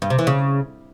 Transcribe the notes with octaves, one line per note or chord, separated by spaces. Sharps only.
G2
C3
E3
C#3